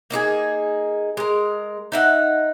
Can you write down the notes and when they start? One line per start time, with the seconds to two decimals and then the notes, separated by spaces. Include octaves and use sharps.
0.10 A#3 D#4 F#4 G#4
1.17 G#3 A#4
1.92 D#4 E5 F#5